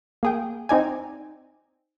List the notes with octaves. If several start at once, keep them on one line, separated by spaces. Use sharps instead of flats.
A#3 G#4 G5
C4 D#4 D5 G#5